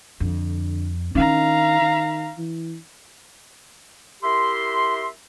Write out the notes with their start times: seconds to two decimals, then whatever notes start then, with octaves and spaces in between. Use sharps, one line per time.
0.20 F2 D3
1.15 D#3 C#4 D4 F5 A#5
1.81 D#3
2.38 E3
4.23 E4 G4 A#4 E5 C6